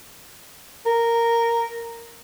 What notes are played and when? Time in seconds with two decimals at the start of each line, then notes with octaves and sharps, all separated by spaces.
0.86 A#4